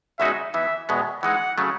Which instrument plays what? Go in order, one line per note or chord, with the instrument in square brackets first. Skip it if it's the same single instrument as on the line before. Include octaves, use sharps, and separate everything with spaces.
[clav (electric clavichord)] E2 C#3 G#3 D#4 F#4 [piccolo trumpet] E5
[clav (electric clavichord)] E3 B3 D#4 [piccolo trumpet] E5
[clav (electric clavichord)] E2 B2 G#3 B3
[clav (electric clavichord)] E3 G#3 D#4 [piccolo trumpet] F#5
[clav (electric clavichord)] C#3 F#3 A3